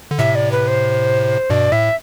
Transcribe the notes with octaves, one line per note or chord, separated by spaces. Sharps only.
D3
A2 C3 E5
D5
B4
C5
G2 B2 D5
A2 E5